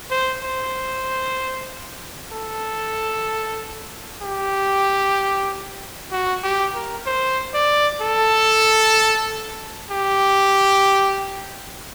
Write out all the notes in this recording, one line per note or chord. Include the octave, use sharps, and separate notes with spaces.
C5
C5
A4
G4
F#4
G4
A#4
C5
D5
A4
G4